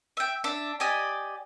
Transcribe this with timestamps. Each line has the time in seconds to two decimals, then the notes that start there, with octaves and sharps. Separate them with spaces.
0.17 E5 G5
0.44 D4 E5
0.80 G4 D5 D#5 G#5